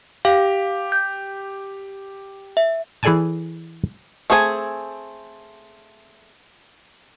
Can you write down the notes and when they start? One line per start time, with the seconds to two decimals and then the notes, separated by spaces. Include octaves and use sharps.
0.25 G4 F5
0.92 G6
2.57 E5
3.03 E3 G#4 A4 D5 G#5 A5
4.30 A3 C4 G#4 B4 G#5